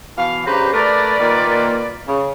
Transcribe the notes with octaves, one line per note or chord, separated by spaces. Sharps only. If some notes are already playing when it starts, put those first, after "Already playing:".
B2 E3 F5
G2 C#3 G4 B4 C5 A#5
A3 A#4 B4 D5
A#2 D#3 A#3
C#3